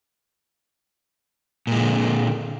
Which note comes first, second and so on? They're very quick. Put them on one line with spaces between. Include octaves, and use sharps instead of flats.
A#2 G#3 E3 D3